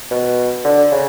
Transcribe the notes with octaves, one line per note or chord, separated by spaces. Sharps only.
B2
D3
C#3